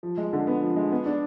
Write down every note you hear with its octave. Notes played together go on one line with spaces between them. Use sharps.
F3
G#3
D3
B3
F3
G#3
B3
D4